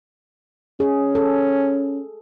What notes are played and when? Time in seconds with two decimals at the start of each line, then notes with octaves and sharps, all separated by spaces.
0.80 C#4 G#4
1.15 A4